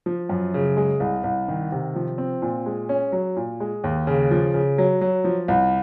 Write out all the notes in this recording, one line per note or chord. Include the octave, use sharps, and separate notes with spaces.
F3
F#2
C#3
G#3
C2
C2
D#3
C3
F3
C4
A#2
G#3
C#4
F#3
A#2
G#3
D#2
C#3
F3
C#3
F#3
F#3
F3
C2